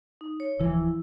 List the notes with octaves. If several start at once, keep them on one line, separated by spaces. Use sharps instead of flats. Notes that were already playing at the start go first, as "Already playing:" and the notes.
D#4
C#5
D1 E3 F3 E4